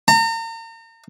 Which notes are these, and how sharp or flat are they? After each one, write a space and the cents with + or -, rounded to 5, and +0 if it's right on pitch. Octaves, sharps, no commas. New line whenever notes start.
A#5 -40